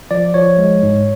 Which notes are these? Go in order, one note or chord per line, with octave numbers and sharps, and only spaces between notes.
F3 D5
F3 C#5
G#3
G#2